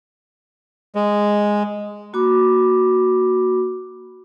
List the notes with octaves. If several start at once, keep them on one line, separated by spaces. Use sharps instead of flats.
G#3
A#3 F#4 B5 D6